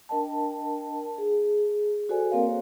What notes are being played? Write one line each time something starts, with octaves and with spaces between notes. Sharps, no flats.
D4 A#4 D#5 G5 A5
G#4
F#4 A4 C5 D5 G#5
A#3 C4 A#4 C#5 F5